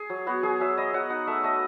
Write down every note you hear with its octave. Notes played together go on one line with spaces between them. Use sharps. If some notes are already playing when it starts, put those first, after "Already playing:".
Already playing: G#4
F#3
B3 F#4
F#3 G#4
F#3 E5
B3 D#5
F#3 F#5
D#4 F#5
A3 E5
A3 D#5